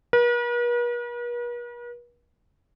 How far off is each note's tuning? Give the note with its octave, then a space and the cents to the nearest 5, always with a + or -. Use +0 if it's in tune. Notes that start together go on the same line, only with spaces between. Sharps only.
B4 -45